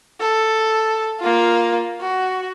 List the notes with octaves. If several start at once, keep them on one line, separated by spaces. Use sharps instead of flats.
A4
A#3 F4
F#4